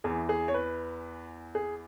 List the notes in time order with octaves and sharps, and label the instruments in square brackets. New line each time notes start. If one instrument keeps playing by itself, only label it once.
[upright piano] E2 E3 G#4
G#4
C#5
B4
G#4